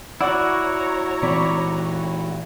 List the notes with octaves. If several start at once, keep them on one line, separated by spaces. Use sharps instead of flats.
E4 F#4 C#5 D5 F#5 A#5
A#2 E3 C4 D5 B5 C#6